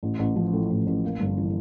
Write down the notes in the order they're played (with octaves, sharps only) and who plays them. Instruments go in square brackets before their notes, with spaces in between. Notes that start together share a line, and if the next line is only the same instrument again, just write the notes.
[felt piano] A1
A1
F3
A2
A1
A1
A#3
G1
E3